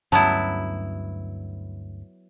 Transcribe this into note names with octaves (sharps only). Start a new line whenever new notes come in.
D2 G2 F#3 B3 C#4 E4 A5